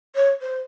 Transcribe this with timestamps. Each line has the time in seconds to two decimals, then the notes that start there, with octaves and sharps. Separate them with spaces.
0.15 C#5
0.41 C5